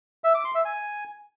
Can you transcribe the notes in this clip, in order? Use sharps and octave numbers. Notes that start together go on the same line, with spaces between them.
E5
D6
C6
E5
G#5